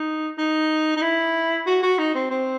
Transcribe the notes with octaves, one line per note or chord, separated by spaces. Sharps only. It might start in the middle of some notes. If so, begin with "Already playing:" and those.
Already playing: D#4
D#4
D#4
E4
F#4
F#4
D#4
C4
C4